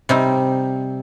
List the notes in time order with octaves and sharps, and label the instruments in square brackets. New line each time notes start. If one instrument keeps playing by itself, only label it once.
[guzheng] C3 G3 D#4